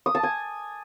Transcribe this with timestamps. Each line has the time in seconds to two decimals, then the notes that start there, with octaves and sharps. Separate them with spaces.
0.06 D#6
0.15 A5
0.23 G#5